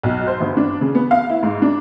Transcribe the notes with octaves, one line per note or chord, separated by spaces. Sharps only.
B1
C5
G1
D4
C#3
B3
F5
E4
G#2
D4